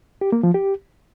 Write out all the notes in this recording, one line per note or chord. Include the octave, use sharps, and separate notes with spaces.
G4
A#3
F3
G4